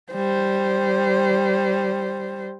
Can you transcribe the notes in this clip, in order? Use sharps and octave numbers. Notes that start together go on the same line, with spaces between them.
G3 C5